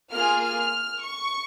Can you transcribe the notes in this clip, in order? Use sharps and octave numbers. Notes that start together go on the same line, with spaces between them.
A#3 F4 G#4 F6
F6
C#6